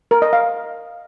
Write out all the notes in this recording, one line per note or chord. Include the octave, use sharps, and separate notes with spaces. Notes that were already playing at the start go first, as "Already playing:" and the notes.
A#4
D#5
F5